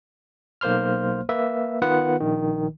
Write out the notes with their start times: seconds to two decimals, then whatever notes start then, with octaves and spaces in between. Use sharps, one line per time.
0.61 B1 A#3 C5 C6 F6
1.29 A#3 B4 E5
1.82 D#3 B3 F4 B4 F#5
2.20 A#1 D#3